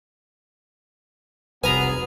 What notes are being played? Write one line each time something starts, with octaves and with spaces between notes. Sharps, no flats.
F1 C2 F#3 B3 G#4 B4 G#5 A#5